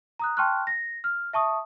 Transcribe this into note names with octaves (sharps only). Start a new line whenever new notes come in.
A#5 D#6 F#6
G5 A5 C6 C#6 F6 F#6
A#6
F6
E5 A5 C#6 D#6